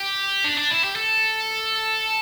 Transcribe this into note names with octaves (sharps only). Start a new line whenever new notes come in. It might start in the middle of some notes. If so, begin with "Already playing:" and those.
Already playing: G4
D4
D4
E4
G4
A4